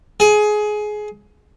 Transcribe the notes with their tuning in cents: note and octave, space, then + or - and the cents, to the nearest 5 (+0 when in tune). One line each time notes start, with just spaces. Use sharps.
G#4 +20